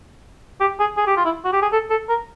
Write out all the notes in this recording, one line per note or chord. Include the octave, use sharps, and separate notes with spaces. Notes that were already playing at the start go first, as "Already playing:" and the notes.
G4
G#4
G#4
G4
F4
E4
F#4
G4
G#4
A4
A4
A#4